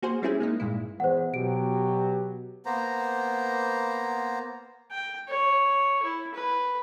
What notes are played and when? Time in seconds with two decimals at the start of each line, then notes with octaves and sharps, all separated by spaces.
0.02 A#3 F#4 G#4 C5
0.22 G3 C4 C#4 E4 G#4
0.40 G#3 A#3 D#4
0.60 G2 A#2 G#3 E4
1.00 E2 C5 F#5
1.34 B2 F#3 G4 D7
2.66 A#3 B3 C5 A#5
4.91 G5
5.28 C#5
6.02 E4
6.34 B4